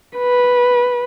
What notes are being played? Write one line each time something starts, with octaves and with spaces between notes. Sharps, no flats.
B4